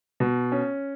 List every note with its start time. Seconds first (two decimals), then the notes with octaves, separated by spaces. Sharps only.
0.20 B2
0.52 C#4